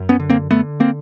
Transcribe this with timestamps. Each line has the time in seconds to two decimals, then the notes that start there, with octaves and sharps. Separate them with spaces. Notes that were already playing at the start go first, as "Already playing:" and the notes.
Already playing: F#2
0.09 B3 C#4
0.19 D3
0.30 A#3 C4
0.51 D3 A3 B3
0.80 A#3 C4